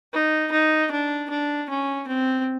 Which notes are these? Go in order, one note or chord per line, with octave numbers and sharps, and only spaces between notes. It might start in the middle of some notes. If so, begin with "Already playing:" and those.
D#4
D#4
D4
D4
C#4
C4